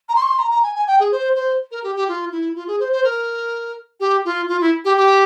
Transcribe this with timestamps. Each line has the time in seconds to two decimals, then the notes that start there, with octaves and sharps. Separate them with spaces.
0.09 A#5
0.15 C6
0.22 C#6
0.27 C6
0.39 A#5
0.51 A#5
0.63 G#5
0.75 G#5
0.87 G5
0.99 G#4
1.12 C5
1.35 C5
1.71 A#4
1.84 G4
1.95 G4
2.08 F4
2.32 E4
2.55 F4
2.67 G#4
2.80 C5
2.92 C5
3.04 A#4
4.00 G4
4.25 F4
4.48 F4
4.61 E4
4.84 G4
4.97 G4